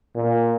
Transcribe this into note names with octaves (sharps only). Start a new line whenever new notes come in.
A#2